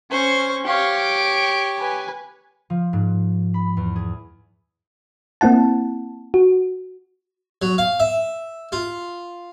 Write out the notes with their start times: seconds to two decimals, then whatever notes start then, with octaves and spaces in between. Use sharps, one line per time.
0.11 C#4 C5 C#6
0.65 G4 C#5 F5 C#6
1.00 D7
1.79 B4 G#5
2.70 F3
2.93 G#2
3.54 B5
3.77 E2
3.96 G#4
5.41 A#3 C4 E4 F#5 A5
6.34 F#4
7.62 F#3
7.78 F5
8.00 E5
8.72 F4